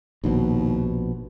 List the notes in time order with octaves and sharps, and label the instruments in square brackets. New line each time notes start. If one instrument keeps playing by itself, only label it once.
[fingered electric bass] A#1 B2 [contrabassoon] D#2